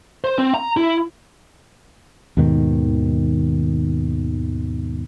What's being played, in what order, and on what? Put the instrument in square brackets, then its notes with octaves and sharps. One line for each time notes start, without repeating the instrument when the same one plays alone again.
[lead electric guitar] C5
C4
A#5
E4
[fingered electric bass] D#2 G#2 B2 D#3